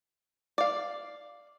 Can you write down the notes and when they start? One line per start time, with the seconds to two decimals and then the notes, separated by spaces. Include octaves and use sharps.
0.58 D5 F5